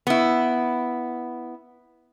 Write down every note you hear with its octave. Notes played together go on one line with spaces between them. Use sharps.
B3 E4